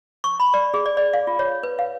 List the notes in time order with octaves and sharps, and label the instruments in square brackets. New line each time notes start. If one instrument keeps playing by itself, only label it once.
[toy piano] C#6
B5
D5
G#4
D5
D5
F5
F4
C#5
B4
F5